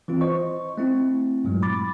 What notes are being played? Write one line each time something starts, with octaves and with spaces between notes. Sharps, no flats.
E3 C4 F4
C5 D#5 C#6
A3 C4 E4
G2 A#2 F#3 G#3
B5 D6 A6